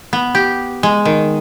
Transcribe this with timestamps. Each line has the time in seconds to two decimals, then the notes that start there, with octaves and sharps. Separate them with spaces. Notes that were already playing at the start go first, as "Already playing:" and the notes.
0.13 B3
0.35 G4
0.83 G#3
1.05 D#3